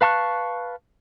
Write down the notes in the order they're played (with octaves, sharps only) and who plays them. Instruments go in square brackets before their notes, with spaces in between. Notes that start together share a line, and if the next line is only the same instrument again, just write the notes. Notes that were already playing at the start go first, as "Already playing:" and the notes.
[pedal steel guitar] B4 F5 A5 C#6 F#6